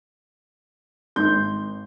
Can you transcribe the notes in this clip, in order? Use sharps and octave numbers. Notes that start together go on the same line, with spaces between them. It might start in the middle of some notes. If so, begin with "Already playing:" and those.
G#1 C6 G6